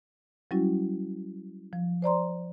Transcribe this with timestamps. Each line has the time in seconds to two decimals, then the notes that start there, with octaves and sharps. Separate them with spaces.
0.51 F#3 G3 C#4 E4 F#4
1.73 F3
2.02 C5 D5 A#5 C6